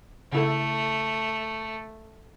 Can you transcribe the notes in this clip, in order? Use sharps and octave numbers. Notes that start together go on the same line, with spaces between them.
C#3 A3 E4 A4